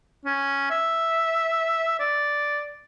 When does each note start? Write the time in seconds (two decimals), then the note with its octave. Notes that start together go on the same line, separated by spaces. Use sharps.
0.25 C#4
0.70 E5
1.99 D5